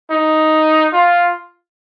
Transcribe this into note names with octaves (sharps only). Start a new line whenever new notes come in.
D#4
F4